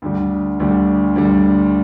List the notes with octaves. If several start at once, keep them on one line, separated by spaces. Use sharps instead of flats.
D2 D3 G3
D2 D3 G3
D2 D3 G3